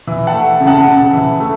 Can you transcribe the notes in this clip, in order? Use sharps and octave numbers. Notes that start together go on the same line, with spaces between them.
E3
F#5 A5
A3
C#3
F#5 A5
C#3
E3
A3